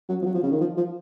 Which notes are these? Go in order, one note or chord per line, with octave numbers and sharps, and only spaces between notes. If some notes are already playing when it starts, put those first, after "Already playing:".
F#3
F3
F#3
F3
C#3
D#3
F3
F3